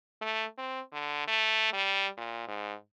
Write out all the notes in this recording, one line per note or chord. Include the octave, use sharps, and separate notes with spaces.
A3
C4
D3
A3
G3
A#2
G#2